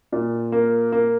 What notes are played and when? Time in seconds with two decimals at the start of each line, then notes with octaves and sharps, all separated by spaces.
0.12 A#2
0.52 A#3
0.92 A#3